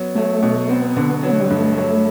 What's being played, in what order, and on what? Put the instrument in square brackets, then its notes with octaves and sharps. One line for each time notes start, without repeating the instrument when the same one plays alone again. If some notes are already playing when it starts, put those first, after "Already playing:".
Already playing: [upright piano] F#3 B3
[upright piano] F#3 [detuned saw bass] A3
[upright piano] B2
[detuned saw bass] B3 [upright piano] C4
[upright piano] D3
[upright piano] F#3 [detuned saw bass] B3
[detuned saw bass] A3
G3
[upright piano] G2 [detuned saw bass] A3
[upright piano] F#3 [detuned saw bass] A3